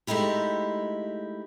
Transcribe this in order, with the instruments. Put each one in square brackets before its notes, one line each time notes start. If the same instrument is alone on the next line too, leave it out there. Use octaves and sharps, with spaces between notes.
[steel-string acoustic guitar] G#3 A3 D#4 E4 G4